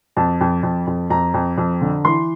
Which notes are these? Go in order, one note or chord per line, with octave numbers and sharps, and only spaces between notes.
F2 A5
F2
F2
F2
F2 A#5
F2
F2
D3
E3 C6